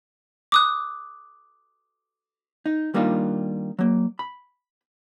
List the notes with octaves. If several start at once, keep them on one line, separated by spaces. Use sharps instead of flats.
D6 D#6 F#6
D#4
D#3 G3 A#3 D4 D#4 F4
F#3 A#3
B5